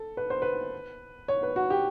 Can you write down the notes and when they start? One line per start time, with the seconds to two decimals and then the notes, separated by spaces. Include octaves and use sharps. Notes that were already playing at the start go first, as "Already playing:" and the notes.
Already playing: A4
0.17 B4
0.30 C5
0.42 B4
1.28 C#5
1.43 B4
1.56 F#4
1.70 G4